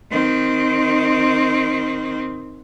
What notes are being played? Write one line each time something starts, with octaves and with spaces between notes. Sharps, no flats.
D#3 C4